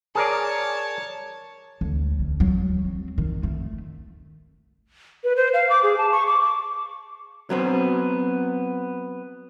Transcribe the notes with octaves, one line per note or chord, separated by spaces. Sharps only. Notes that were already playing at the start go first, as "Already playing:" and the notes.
G#4 A#4 C#5 D5 A5
D2
D2
F#3
C4
D#3
A3
B4
C5
F5
D6
G#4
A5
C#6
D6
D6
F#3 B3 C4